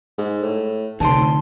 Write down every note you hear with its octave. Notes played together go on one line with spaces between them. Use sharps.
G#2
A2
F1 D2 C3 D#3 A5 C6